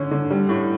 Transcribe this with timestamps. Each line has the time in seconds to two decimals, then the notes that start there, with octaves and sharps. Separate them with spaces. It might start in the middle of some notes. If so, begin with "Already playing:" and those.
Already playing: D3 C#4
0.11 D3
0.30 G3
0.49 A2